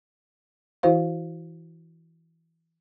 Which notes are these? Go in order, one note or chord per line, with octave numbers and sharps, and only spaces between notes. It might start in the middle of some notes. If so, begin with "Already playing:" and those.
E3 E4 F#4 C5 F5